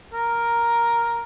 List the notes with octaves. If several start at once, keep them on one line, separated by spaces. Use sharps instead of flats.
A#4